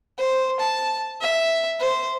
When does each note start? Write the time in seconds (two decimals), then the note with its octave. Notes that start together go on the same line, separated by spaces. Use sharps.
0.18 C5
0.60 A5
1.21 E5
1.80 C5